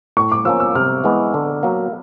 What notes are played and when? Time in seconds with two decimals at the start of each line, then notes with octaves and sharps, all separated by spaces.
0.17 A2 C#6
0.32 D6
0.45 F3 A#3 C#4 E6
0.60 E6
0.75 C3 F6
1.04 E3 G#3 B3
1.34 D3
1.63 F#3 A#3